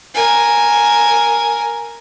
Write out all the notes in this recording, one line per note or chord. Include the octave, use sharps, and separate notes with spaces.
A#4 G#5